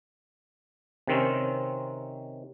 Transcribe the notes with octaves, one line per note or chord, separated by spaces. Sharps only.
C3 D#3 C4 C#4